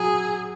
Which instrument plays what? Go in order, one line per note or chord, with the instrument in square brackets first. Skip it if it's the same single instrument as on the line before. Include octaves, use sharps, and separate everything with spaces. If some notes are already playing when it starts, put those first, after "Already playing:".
Already playing: [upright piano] F#3 [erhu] G#4